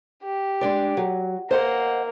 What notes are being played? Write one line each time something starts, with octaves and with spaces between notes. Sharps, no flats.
G4
G#3 D4 D5
F#3
A#3 C5 D#5 F#5